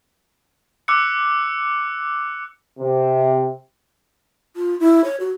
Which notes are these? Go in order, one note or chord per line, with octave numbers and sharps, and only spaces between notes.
D6 E6 F#6 C#7
C3
F4
E4
C#5
F#4